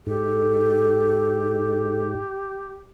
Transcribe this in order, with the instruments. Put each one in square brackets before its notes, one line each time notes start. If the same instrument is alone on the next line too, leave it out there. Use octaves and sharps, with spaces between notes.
[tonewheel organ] G#2 [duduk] G4 [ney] A4